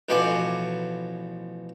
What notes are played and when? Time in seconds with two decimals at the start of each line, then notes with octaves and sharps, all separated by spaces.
0.09 A1 B2 F3 G#5 C#6 D6